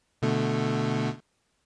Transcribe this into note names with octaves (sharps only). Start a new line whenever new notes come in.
B2 D3 A3